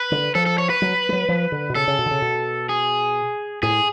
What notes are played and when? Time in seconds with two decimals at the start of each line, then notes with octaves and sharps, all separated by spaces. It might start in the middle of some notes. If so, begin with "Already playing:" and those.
Already playing: B4
0.12 D3
0.35 F3 A4
0.46 A4
0.58 C#5
0.70 B4
0.82 F#3
1.09 G#3
1.12 F#3
1.29 F3
1.52 D3
1.70 B2
1.75 C#3 A4
1.88 C#3
1.99 B2
2.06 D3
2.11 C#3
2.22 B2
2.69 G#4
3.63 A2 G#4